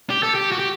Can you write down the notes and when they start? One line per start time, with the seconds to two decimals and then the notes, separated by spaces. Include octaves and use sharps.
0.10 G4
0.23 A4
0.35 G4
0.52 F#4
0.59 G4